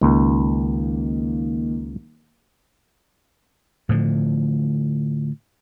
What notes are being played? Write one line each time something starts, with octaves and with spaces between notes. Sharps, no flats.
C#2 D#3 A#3 D#4
A2 D3 F3